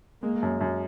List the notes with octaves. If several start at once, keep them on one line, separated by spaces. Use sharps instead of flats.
G#3 A#3
F#2
F#2